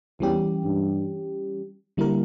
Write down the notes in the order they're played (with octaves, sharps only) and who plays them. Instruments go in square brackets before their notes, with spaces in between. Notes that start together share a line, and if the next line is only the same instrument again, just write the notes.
[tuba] E2 [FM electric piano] E3 G3 C#4 G4
[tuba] G2
[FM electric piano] D3 G3 A#3 E4 A#4